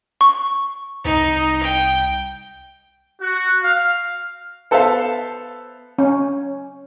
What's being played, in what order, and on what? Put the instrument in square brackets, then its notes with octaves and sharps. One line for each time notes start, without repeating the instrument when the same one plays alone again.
[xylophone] C#6
[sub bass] C2 [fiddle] D#4
[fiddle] G5
[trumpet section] F#4
F5
[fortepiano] B3 A4 C5 E5 F5 A5
[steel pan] C#4